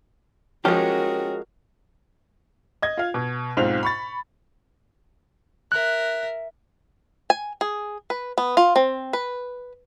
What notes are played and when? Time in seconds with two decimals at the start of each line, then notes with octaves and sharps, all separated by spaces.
0.65 F3 G#3 C#4 F#4 G4 A#4
2.82 D#5 G#6
2.97 F4 F5
3.14 B2
3.57 B1 G#2 C4 F4 F7
3.83 B5 C#6 A6
5.72 A#4 E5 F#6
7.30 G#5
7.61 G#4
8.10 B4
8.38 B3
8.57 F4
8.76 C4
9.13 B4